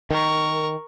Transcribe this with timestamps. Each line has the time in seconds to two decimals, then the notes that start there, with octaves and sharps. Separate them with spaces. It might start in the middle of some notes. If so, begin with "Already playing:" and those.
0.11 D#3 A#4 C#6